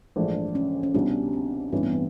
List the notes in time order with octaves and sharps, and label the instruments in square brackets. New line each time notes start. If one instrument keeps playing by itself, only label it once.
[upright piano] A#1 G#2 E3 A3 D4
[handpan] C#4
C#4
[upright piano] C2 B2 G3 [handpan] D4
[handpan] C4
[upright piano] A1 G2 E3 [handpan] C4
[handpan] B3
C4